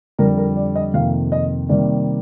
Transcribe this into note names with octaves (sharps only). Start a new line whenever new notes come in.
F2 D3 G3 A#4
A#4
D5
D#5
F2 C3 D#3 A#3 F5
D#5
C3 D#3 G3 A#3 D5